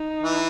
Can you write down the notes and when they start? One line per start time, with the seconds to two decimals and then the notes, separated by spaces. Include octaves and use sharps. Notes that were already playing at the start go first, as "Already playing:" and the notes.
Already playing: D#4
0.23 E3